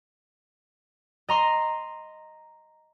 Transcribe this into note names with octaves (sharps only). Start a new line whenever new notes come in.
D#5 A#5 C6